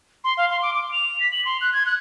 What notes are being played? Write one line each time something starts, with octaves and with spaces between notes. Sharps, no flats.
C6
F5
C6
D6
D6
F7
B6
F#7
C6
F#6
G#6
F#6